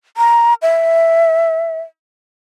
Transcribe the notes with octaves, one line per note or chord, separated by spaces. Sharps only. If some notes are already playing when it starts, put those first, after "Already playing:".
A#5
E5